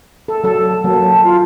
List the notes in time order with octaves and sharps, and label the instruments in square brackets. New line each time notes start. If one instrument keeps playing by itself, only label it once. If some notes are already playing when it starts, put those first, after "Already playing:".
[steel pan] A4
F#3 A4
[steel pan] F#3 A#3 [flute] A5
[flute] F4